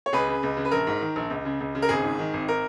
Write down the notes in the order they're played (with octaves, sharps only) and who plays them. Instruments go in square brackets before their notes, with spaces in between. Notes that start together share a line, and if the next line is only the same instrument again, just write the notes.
[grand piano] C#5
C#2 G#4 B4
C#3
C#2
C#3
B4
A#1 A#4
G#2
D#3
A#1
C#2
C#3
C#2
C#3
A#4
G#1 G#4
G#2
D#3
G#1
A#4